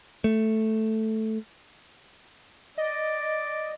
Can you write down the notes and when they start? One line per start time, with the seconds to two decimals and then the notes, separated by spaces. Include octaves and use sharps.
0.24 A3
2.78 D5 D#5